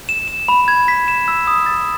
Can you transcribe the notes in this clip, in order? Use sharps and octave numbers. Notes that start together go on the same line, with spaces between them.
E7
E7
B5
G#6
B6
E7
E6
D#6
A6